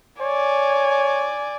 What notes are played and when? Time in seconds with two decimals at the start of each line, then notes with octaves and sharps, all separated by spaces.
0.21 C#5 D5 G#5